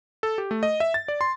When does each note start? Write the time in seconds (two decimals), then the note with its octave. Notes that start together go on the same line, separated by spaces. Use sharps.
0.23 A4
0.38 G4
0.51 A3
0.63 D#5
0.80 E5
0.94 A6
1.08 D5
1.21 C6